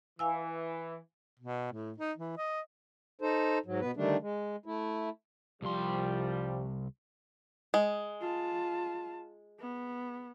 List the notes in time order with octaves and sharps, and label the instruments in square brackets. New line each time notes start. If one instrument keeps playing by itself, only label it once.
[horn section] E3 [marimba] F5 G#5 E6
[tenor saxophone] B2
A2
D#4
E3
D#5
[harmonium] D#4 A4 C5
G#2 F#3
B2 B3 B4
D3 D#3 G3 A3 D4
G#3
A3 E4
[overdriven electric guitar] C2 C6 [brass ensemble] F3 G3
[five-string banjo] G#3
[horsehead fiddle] F4 A5
B3